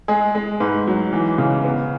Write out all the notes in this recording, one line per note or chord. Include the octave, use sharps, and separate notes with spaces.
G#3 G#4
G#3
G#2 B4
F#3
E3
C#3
B3